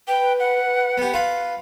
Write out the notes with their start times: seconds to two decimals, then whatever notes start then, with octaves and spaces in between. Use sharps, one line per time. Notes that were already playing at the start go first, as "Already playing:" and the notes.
0.08 B4 G5
0.40 F#5
0.98 B3 G4
1.14 F4 B4